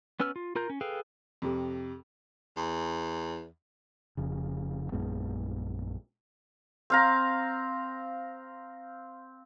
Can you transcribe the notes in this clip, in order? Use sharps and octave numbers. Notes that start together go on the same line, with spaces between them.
B3 C#4 B4 E6 F6
F4
F4 A#4 A#5 G6
C#4
G#4 A4 B4 F5 G5
F2 C3
E2
F1 F2 C#3
A#1 F#2 G#3 B3
C4 F5 A#5